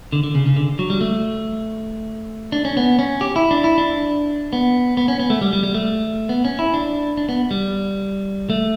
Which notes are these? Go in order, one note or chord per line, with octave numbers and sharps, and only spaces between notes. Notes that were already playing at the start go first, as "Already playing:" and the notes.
D3
D3
C#3
C#3
D3
F#3
G3
A3
D4
C#4
B3
C#4
G4
E4
D4
E4
D4
B3
B3
C#4
B3
A3
G3
G3
G3
A3
B3
C#4
E4
D4
D4
B3
G3
A3